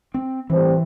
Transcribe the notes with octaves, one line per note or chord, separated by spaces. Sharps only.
C4
A2 E3 G3 C4